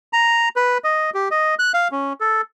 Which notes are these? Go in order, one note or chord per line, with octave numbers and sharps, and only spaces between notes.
A#5
B4
D#5
G4
D#5
F#6
F5
C#4
A4